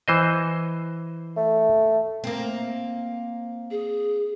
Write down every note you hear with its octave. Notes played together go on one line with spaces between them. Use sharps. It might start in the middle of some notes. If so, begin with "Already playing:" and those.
E3 C5 D#5
A3
A#3 C4
G#4